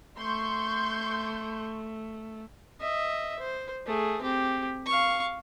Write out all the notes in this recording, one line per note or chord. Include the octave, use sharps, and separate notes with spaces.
A3 C6 C#6 G6
D#5 E5
C5
A3 G#4
C4 G4
F5 C#6